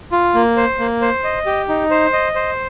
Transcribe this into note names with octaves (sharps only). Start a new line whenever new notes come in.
F4
A#3
C5
A#3
C5
D#5
G4
D#4
C5
D#5
C5